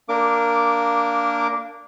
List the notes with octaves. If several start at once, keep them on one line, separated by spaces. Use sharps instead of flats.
A#3 D4 A#4 D6